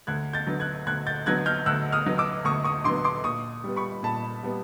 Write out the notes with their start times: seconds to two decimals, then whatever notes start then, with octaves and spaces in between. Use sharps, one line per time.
0.07 D2 F#6 G#6
0.33 G6 A6
0.47 D3 F#3 B3
0.60 F#6 G#6
0.86 D2 F#6 G#6
1.07 G6 A6
1.26 D3 F#3 B3 F#6 G#6
1.46 F6 G6
1.66 D2 E6 F#6
1.92 D#6 F6
2.05 D3 F#3 B3
2.18 D6 E6
2.45 D2 C#6 D#6
2.64 C#6 D#6
2.84 D3 F#3 B3 C6 D6
3.04 C6 D6
3.24 A#2 C#6 D#6
3.64 G3 B3
3.76 B5 C#6
4.03 A#2 A5 B5
4.43 G3 B3